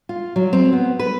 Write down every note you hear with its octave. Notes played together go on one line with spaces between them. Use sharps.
F4
F#3
C4
B3
B4